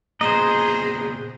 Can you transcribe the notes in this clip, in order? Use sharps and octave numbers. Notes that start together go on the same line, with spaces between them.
A#2 C#3 B3 G#4 C5 D#5 A#5